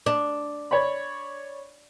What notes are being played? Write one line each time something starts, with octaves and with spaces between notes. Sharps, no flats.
D4
C#5 D5 B5